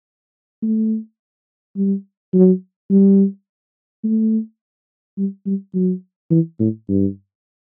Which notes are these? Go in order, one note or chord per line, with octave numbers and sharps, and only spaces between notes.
A3
G3
F#3
G3
A3
G3
G3
F#3
E3
A2
G2